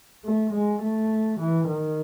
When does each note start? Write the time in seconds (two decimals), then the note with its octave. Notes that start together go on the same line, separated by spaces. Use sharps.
0.25 A3
0.54 G#3
0.82 A3
1.40 E3
1.68 D#3